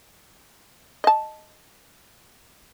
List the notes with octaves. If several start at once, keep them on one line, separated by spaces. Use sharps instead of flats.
D#5 A5